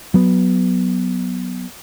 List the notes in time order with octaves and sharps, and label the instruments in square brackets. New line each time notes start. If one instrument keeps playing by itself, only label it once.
[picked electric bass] F#3 B3